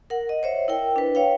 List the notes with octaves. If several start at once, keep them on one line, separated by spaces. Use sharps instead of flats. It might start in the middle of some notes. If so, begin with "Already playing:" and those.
A#4 F#5
D#5
C5 C#5 E5
E4 A#4 G5
D4 B4
C#5 F5 G5